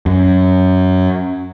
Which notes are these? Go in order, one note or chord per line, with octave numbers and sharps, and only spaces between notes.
F#2